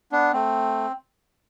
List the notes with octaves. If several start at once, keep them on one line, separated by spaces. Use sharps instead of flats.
B3 D4
A3 C4